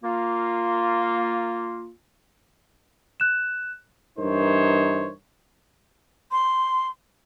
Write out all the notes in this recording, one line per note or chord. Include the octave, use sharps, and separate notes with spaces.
A#3 F4
F#6 E7
G2 E3 D#4 A#4 C5 C#5
C6